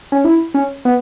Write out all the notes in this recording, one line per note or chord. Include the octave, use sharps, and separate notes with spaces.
C#4
E4
C#4
B3